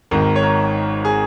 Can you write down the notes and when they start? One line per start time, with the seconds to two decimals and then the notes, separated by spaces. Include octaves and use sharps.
0.11 G#1 G#2 D#3 A#4
0.36 C#5
0.43 A#4
1.05 G#4